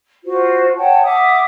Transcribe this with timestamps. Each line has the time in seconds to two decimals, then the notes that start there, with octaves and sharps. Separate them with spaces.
0.24 F4 F#4 C5
0.77 C#5 F#5 G5 A5
1.03 E5 F#5 D6 D#6